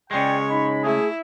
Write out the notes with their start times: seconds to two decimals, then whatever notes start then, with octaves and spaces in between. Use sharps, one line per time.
0.11 C#3 G#3 G#4 C#5 D5 G5
0.50 D#4 B5
0.84 A3 E4 G#4